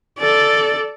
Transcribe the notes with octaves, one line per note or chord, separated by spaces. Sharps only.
A4 D5